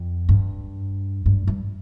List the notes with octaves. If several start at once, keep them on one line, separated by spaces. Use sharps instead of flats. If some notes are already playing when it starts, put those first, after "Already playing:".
Already playing: F2
G2
G2
G2